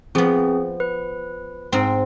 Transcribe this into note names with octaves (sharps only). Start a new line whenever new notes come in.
F3 B3 C4 G#4
B4
G#2 C4